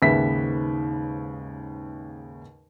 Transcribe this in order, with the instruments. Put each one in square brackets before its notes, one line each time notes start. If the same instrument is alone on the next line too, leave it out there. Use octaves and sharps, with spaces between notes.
[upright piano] D#2 G#2 C#3 B4 E5 B6